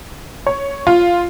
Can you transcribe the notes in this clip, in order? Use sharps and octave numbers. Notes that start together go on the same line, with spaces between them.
C#5
F4